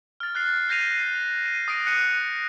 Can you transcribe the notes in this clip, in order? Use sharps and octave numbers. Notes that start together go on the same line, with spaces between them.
F6 A6
F6 F#6 A6 C7
F6 G6 A#6 C7 D#7 F7
D#7
D#6 A#6 D7
F#6 C#7 D#7